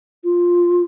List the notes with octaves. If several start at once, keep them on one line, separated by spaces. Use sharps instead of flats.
F4